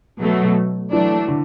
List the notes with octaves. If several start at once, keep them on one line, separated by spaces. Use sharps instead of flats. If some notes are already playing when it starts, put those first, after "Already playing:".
B2 F#3 A3
E3 F#3 A3 D4
D3